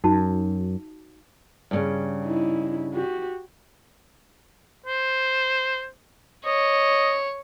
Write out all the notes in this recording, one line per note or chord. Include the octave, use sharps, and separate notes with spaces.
F#2 D#4 F#4 A5
G2 A#2 C#3
D#4 E4
F#4 G4
C5
C#5 D#5